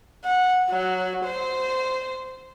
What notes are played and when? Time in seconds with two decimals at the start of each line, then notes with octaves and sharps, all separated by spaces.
0.25 F#5
0.70 F#3
1.25 C5